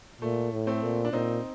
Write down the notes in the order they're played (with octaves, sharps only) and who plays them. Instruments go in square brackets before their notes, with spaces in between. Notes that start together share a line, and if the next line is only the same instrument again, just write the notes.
[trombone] A#2 [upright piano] A3
[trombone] A2
[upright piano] A3 C4
[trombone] A#2
[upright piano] D4
[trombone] A#2 [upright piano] C4 D#4